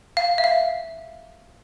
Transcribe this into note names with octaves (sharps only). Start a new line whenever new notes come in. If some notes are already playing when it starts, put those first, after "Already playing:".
F5
E5
F5